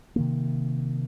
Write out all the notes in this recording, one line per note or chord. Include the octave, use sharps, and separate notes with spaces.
C3 D#3 A#3